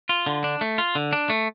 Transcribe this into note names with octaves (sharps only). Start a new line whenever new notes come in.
F4
D3
D4
A3
F4
D3
D4
A3